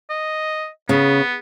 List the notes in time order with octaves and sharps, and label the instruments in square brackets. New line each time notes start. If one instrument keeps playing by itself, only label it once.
[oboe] D#5
[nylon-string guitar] C#3 [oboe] B3